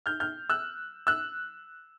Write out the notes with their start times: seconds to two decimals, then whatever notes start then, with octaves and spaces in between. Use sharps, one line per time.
0.06 F6 G6
0.20 F6 G6
0.50 E6 F#6
1.07 E6 F#6